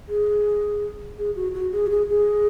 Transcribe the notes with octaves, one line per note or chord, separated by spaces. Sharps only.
G#4
G#4
F#4
F#4
G#4
F#4
G#4
G#4